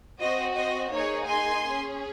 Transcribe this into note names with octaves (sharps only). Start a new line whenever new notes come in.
C4 F#4 C5 D#5
C5 D#5
A#3 D#4 G#4 C#5
G#5 C6
C#4 G#4